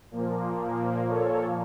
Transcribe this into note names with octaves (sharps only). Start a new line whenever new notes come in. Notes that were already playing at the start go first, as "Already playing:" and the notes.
A#2 F3 A#3
A4 C#5